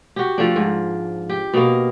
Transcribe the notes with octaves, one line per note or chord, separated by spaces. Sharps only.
F#4 G4
F3 A3 D4
G#2
G4
B2 A#3